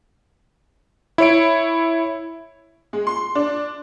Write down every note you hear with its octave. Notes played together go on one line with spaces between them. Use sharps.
E4 C#5 D7
G#3
C6
D4